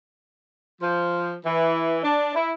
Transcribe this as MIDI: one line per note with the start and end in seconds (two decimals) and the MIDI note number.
0.81 1.34 53
1.45 1.99 52
2.03 2.34 62
2.34 2.52 64